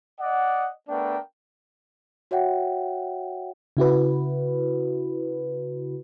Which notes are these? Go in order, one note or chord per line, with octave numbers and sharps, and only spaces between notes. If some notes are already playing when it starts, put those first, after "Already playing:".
D5 D#5 F#5
A3 B3 D4 A#4 G5
F#4 C#5 E5 F#5 G5
C#3 E4 F#4 B4